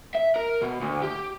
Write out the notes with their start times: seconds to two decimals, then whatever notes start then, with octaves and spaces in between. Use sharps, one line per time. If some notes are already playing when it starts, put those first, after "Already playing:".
0.15 E5
0.36 A#4
0.62 B2
0.82 D2
1.03 G4